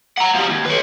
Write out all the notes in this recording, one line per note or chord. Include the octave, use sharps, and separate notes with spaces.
F#5 A#5
F3 G3
D#2
B4 C#5